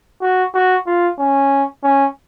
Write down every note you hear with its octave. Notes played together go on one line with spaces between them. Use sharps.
F#4
F#4
F4
C#4
C#4